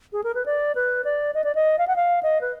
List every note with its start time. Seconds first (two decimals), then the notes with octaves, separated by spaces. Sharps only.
0.13 G#4
0.24 A#4
0.35 B4
0.46 D5
0.75 B4
1.05 D5
1.34 D#5
1.44 D5
1.55 D#5
1.78 F5
1.88 F#5
1.96 F5
2.23 D#5
2.41 B4